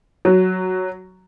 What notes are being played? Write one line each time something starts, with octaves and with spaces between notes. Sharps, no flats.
F#3